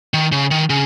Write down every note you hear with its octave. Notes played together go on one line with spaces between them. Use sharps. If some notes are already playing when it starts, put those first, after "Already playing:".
D#3
C#3
D#3
C#3